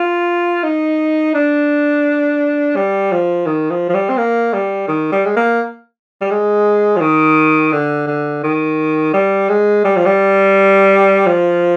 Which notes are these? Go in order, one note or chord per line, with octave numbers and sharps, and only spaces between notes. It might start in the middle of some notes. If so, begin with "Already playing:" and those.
Already playing: F4
D#4
D4
G3
F3
D#3
F3
F3
G3
C4
A#3
G3
D#3
G3
G#3
A#3
G3
G#3
F3
D#3
D3
D3
D#3
G3
G#3
G3
F3
G3
F3